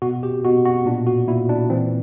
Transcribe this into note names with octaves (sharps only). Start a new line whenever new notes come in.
B2 F#4
G4
B2 F#4
F#4
A#2 D4
F#4
A#2 E4
D4
E3 C4